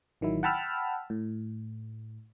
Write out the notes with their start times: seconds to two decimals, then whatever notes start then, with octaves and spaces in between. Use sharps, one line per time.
0.21 A1 D#3 F#3 E4
0.43 F#5 G5 A5 B5 E6 F6
1.10 A2